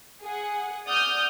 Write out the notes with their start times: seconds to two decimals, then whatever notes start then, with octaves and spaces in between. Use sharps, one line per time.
0.23 G#4 F#5
0.86 D5 F#5 D#6 F6 G6